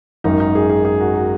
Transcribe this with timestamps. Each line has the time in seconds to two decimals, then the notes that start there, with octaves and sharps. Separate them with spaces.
0.24 G#1 F#2 D#3 D#4
0.40 D#4
0.55 G#4
0.69 G#4
0.85 G#4
1.01 F#4
1.15 F#4